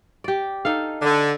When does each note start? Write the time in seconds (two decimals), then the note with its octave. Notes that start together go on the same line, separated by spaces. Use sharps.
0.24 G4 D5
0.65 D#4 A4 F5
1.02 D3